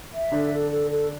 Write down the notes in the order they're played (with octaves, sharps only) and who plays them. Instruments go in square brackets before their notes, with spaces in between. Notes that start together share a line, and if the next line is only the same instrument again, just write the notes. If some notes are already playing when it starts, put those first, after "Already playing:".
[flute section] E5
[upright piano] D3 D4 [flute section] A4
[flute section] A4
A4
A4